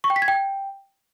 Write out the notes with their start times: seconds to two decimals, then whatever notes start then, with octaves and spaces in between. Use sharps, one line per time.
0.04 C#6
0.10 G5
0.16 B6
0.22 G#6
0.28 G5